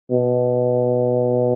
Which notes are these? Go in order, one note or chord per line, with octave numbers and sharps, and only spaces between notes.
B2